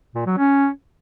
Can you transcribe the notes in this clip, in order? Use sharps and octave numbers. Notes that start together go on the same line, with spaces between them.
A#2
F#3
C#4